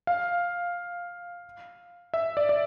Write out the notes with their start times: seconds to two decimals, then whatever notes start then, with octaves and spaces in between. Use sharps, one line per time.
0.07 F5
2.14 E5
2.37 D5
2.49 D5